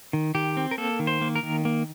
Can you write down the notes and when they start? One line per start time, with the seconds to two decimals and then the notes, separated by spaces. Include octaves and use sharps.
0.13 D#3
0.35 D#3 G4
0.57 C4
0.71 A#4
0.78 A#3 A4
0.99 D#3
1.07 C5
1.21 A#3
1.36 A#4
1.43 D#3
1.65 A#3